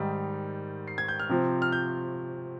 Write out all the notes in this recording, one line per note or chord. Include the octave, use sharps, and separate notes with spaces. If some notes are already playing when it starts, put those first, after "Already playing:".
Already playing: G#2 D#3 G3
C7
G#6
G6
F6
C3 F3 C4
F6
G6